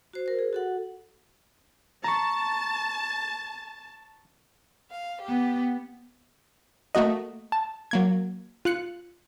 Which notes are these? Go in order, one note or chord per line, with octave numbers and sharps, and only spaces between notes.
F#4 C5
A#4 C5
G#4
F#4 A4 F#5
A5 A#5 C#6
F5
B3 G4
A3 A#3 F#4 D#5
A5
F#3 A#3 G#6
F4 F#6 C#7